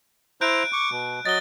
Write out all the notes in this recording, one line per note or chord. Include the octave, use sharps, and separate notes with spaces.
E4 C5 A#5 F#6 G6 D7
C#6 D6
B2
F#3 D#5 A6 G7